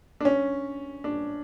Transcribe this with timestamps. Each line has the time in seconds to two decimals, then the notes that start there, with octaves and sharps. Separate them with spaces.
0.21 D4
0.25 C#4
1.04 D4